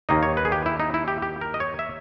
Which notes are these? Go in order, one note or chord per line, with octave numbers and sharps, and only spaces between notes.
D#2 D#3 A#3 D#4 D#5
C#5
B4
G#4
G4
E4
D#4
E4
G4
G4
A#4
D#5
C#5
E5